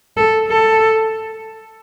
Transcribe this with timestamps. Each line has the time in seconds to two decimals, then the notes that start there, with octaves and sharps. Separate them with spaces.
0.17 A4
0.48 A4